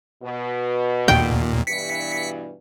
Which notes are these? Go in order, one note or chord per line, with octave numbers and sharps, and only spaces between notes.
B2
D#2 A#2 G5
G2 B2 E3 B6 C#7